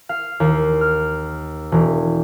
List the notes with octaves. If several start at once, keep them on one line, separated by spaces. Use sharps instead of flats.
F5
D#2
F6
E1